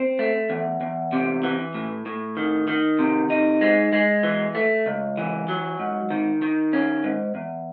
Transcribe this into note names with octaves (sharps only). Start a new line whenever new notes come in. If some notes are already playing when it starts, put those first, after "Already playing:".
Already playing: C4
A3
E2
E2
C3
E3
A2
A2
D#3
D#3
C3
D#4
G#3
G#3
E3
A3
C#2
E3
F#3
G#2
D#3
D#3
C#4
G#2
E2